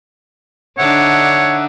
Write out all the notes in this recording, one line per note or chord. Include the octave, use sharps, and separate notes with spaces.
D3 D4 D#4 C#5 E5 F#5